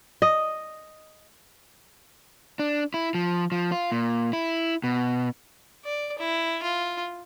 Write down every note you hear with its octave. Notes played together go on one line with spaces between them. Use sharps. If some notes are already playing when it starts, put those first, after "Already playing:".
D#5
D4
E4
F3
F3
F4
A#2
E4
B2
D5
E4
F4